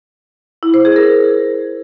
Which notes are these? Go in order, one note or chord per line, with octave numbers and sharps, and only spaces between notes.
E4
C5
G#4
A#4